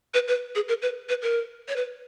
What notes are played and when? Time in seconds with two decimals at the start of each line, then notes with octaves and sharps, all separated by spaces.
0.14 B4
0.28 B4
0.55 G#4
0.68 A#4
0.82 B4
1.09 B4
1.22 A#4
1.68 C#5
1.76 B4